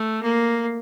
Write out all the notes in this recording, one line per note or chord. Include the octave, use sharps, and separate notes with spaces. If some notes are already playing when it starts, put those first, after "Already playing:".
Already playing: A3
A#3